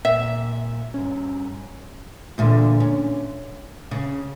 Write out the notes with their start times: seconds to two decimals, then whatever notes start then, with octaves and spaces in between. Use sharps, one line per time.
0.05 A#2 E5
0.94 G2 C#4
2.38 E2 A#2 D3
2.80 C#4
3.91 C#3